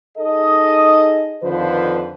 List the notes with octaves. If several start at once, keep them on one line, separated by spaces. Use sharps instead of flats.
D#4 G#4 A4 D#5
F2 D3 D#3 F3 B4 C5